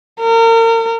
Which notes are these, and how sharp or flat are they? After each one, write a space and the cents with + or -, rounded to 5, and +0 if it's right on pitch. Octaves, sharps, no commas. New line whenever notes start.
A#4 -35